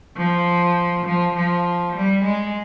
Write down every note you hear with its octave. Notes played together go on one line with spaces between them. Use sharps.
F3
F3
F3
G3
G#3